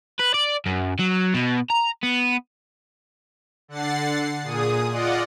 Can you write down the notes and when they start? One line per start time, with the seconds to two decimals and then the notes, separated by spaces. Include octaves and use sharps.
0.20 B4
0.34 D5
0.66 F#2
1.00 F#3
1.34 B2
1.70 A#5
2.03 B3
3.68 D3 F#5 A6 C7
4.43 A#2 G#4 D#6
4.90 F4 D5 D#5 F#5